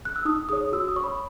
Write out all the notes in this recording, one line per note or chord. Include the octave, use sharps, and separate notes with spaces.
F#6
E6
D#4 D#6
G#4 C#5 D#6
F#4 E6
D#6
C#5 C#6
B5